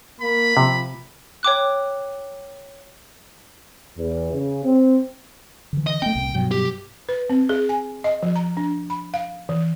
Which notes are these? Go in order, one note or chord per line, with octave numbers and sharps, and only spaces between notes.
A#3 B5
C3 F3
C#5 G5 D6 F#6
E2
C#3
C4
D3 E3
D#5
A3 C4 G5
C2 A#2
G2 B2 F#3
G4
B4
C4
G#4
G#5
D#5
F3
A#5
D4
B5
F5
E3